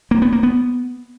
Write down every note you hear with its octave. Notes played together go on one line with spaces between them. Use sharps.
A#3
B3
A#3
B3